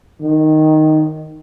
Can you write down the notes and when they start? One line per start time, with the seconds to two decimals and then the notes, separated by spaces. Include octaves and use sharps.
0.22 D#3